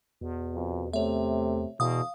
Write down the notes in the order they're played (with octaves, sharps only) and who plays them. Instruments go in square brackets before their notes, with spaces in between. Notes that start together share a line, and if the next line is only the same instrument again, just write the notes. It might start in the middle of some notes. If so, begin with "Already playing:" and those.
[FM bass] E2 [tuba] B2
[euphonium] F2
[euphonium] C3 [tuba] A3 [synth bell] C#5 E5
[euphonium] E2 [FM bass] B2 [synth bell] F5 D#6